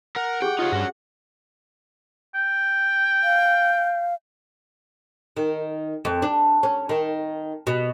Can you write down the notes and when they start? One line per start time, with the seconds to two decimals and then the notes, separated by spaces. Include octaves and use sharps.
0.16 A#4 F#5
0.42 G4 G#4 G5 D6
0.59 D#4 F4 C#5
0.72 G2 C#4 F#4
2.35 G5
3.24 F5
5.37 D#3
6.05 F2
6.22 D4
6.63 C#4
6.89 D#3
7.67 B2